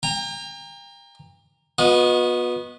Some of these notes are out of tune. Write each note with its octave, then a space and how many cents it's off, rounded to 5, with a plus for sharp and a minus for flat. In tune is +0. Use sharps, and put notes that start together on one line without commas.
G5 +40 A#5 -10
B3 -10 F#4 -40 D#5 +0